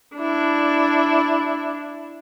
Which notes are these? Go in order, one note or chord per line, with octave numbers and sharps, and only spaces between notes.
D4 E4